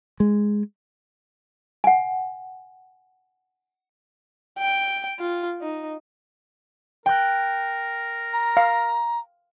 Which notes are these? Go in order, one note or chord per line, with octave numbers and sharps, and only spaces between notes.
G#3
F#5 G#5
G5
F4
D#4
A#4 G5 F#6
A#5
F5